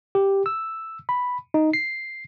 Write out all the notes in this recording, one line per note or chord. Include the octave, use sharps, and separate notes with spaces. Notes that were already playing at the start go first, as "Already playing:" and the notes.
G4
E6
B5
D#4
C7